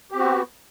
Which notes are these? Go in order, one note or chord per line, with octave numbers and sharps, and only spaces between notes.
B3 C4 F#4 G4